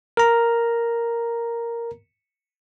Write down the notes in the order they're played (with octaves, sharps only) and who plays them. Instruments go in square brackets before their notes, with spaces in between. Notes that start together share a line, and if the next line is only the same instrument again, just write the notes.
[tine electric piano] A#4 A#5